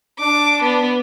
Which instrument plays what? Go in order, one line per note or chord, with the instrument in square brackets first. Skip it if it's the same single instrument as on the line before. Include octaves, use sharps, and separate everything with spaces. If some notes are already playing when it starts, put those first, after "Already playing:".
[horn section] D4 [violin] D6
[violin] B3